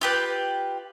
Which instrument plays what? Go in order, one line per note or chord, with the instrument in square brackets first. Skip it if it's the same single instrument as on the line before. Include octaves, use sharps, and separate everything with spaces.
[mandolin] F4 G4 B4